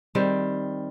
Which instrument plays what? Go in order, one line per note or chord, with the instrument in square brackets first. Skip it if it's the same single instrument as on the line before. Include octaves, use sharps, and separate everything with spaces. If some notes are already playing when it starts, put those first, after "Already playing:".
[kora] D#3 G3 C4